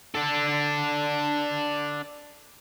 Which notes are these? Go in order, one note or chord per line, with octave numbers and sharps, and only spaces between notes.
D4 A4